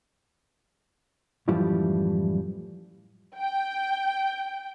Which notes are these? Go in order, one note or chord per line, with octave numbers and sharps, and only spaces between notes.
F#2 A2 E3 F3 G3
G5